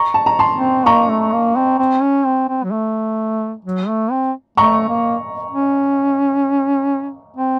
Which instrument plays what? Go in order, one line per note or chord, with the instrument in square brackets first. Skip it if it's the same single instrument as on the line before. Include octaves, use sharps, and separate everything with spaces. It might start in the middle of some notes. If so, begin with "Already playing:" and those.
Already playing: [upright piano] A#5 C#6
A5
A#5
A5 C6
[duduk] C4
[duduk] A#3 [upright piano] A#5 C#6
[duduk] A3
A#3
C4
C4
C#4
C4
C4
F#3
A3
F#3
A3
C4
[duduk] A3 [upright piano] A#5 C#6
[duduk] A#3
C#4
C4